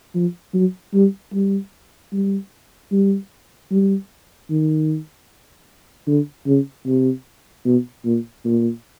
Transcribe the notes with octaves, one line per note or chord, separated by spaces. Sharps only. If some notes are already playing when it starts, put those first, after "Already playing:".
F3
F#3
G3
G3
G3
G3
G3
D#3
D3
C#3
C3
B2
A#2
A#2